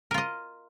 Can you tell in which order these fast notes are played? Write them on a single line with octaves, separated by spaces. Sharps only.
A#4 F4 D#5